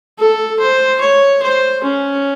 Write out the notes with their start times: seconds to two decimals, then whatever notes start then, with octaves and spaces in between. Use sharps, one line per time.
0.18 A4
0.59 C5
1.00 C#5
1.42 C5
1.83 C#4